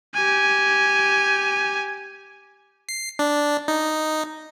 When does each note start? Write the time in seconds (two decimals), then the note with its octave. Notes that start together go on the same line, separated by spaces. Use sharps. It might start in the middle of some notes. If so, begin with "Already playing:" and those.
0.14 G4 G#5
2.89 C7
3.19 D4
3.68 D#4